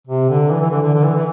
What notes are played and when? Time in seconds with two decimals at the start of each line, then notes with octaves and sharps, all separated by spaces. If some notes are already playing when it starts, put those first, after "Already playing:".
0.07 C3
0.29 D3
0.50 E3
0.61 E3
0.71 D3
0.83 D3
0.94 D3
1.04 E3
1.15 E3